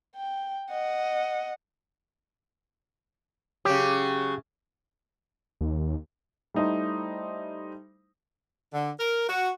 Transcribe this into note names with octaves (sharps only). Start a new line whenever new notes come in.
G5
D#5 F#5
C#3 F#3 G4
D#2
G3 A3 D#4 E4 C5
D3
A#4
F#4